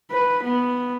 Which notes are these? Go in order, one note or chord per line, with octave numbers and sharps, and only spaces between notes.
B4
B3